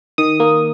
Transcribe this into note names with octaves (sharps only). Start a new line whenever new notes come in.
D#3 D#6
A#3